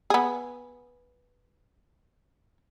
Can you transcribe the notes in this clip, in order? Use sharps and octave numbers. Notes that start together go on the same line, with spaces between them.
B3 G#4